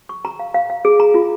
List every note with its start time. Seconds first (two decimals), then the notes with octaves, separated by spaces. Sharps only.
0.09 C#6
0.25 A#5
0.40 F5
0.54 F5
0.70 F5
0.85 G#4
1.00 A#5
1.14 F4